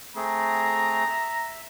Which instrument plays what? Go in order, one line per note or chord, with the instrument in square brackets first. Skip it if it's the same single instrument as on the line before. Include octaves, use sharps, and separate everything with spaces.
[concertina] A3 C4 G#4 [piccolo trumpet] A#5
[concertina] E5